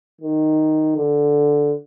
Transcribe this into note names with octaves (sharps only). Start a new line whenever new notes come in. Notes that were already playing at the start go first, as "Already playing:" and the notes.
D#3
D3